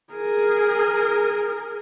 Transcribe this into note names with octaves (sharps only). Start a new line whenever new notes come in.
G#4 A#4